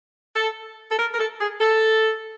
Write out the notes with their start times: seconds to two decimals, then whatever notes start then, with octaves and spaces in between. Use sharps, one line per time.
0.35 A4
0.92 A4
0.98 A#4
1.14 A#4
1.19 A4
1.40 G#4
1.61 A4